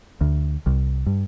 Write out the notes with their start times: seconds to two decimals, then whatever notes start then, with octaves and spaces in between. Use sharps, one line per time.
0.21 D2
0.66 C2
1.06 G2